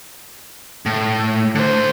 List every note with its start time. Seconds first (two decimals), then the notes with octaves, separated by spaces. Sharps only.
0.86 A2
1.55 D3 C5